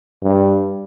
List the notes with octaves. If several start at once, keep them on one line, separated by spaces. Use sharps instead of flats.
G2